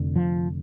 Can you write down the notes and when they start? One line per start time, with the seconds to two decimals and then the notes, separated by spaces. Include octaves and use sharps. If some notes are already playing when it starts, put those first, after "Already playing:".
Already playing: F1 F2 D3
0.16 F3